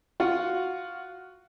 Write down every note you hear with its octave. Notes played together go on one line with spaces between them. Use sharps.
F4 F#4 F#5